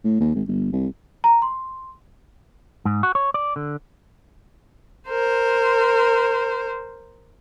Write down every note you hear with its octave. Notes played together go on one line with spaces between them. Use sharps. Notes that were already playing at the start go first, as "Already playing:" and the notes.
A2
D#2
G#1
G1
C2
A#5
C6
G#2
F#4
C#5
D5
D3
A#4 C5